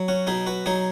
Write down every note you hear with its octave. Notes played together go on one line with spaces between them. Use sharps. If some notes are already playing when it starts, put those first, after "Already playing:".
Already playing: F#3
C#4 F#4
B2 D#4 G#4
F#4 B4
F#3 D#4 G#4